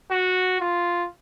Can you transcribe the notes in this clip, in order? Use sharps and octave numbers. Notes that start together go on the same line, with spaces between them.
F#4
F4